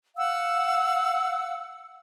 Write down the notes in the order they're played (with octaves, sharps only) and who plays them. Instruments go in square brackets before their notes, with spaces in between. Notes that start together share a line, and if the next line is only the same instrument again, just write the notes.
[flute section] F5 F#5 E6